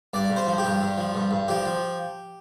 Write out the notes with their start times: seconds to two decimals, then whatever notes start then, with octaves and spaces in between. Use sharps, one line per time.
0.14 G2 D5
0.30 G2
0.36 C5
0.47 F3
0.58 G4
0.65 G2
0.81 G2
0.98 F3
1.15 G2
1.31 G2
1.48 F3 G4
1.66 F3